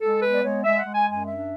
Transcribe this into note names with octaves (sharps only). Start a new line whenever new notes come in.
G#3 A4
B3 B4
D5
G#3 C#5
G#3 E5
F#5
G#3
G#5
F#2 G#5
D4 E5